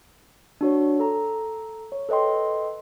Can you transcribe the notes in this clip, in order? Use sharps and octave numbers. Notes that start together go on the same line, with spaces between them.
D4 F#4 C#5
A4 A#5
C#5
A4 B4 D#5 G5 C6